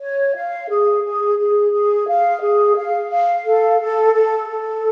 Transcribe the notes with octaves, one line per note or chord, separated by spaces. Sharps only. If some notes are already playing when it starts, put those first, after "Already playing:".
C#5
F5
G#4
G#4
G#4
G#4
F5
G#4
F5
F5
A4
A4
A4
A4